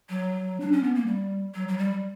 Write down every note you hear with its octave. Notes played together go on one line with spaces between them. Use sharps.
F#3
D4
C#4
B3
A#3
G3
F#3
F#3
G3